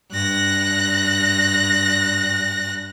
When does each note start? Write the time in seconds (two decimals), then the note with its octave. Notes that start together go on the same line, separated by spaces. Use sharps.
0.11 G2 F#6 A#6